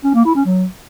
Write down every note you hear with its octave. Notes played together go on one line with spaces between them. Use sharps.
C#4
A#3
E4
C#4
F#3